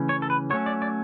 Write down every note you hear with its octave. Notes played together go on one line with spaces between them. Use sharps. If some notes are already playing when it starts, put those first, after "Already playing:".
Already playing: C#3 E3 A3 C#4
C#5
A4
B4
F#3 A3 C#4 C#5
D5
D5